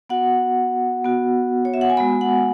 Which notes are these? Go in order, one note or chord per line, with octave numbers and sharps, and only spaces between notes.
B3 F#4 F#5
B3 F#4
C#5
E5
F#5
G#5
G#3 B3 F#4 B5
F#5